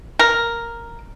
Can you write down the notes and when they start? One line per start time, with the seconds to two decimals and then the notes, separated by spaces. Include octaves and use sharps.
0.19 A#4